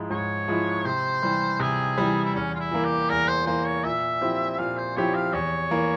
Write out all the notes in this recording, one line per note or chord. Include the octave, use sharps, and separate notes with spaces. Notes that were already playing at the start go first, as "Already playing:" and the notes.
Already playing: G#2 F3 G#3 E4
G#2 C#5
F3 G#3 E4
C3 C5
E3 G3
C3 G#4
E3 G3
E4
E2 C#4
F4
E4
E3 A#3
G4
E2 A#4
C5
E3 A#3 C5
C#5
A#2 E5
F3 C4 E4 G4
A#2 F5
C5
F3 C4 E4 G4 C#5
F5
E2 C#5
E3 A#3